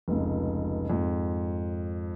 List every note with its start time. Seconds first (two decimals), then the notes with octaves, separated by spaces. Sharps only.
0.08 F1 C#2
0.90 F2 G#2